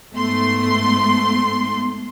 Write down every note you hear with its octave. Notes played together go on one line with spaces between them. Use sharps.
G#2 A3 B3 C6